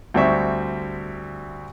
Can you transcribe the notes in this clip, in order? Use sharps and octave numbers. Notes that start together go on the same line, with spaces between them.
D2 G3 C4 E5 C#6